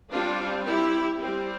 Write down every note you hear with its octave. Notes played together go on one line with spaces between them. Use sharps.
G3 C4 D4 F4
E4 G4
G3 C4